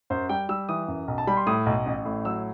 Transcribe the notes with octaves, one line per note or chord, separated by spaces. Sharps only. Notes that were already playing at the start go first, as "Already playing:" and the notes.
F#2 C5
G3 G5
G3 E6
E3 D#6
F#2
B1
A5
G3 B5
C6
A2 D#6
B1
A1
A2
F#3 E6